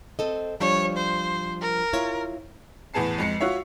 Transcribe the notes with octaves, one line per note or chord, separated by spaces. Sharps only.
C4 A4 D#5
F3 G3 D4 C#5
C5
A#4
E4 F4 C#5
E2 A2 B3 G#4 A5 C7
F2 G#3 C7 C#7
F4 F#4 C#5 E5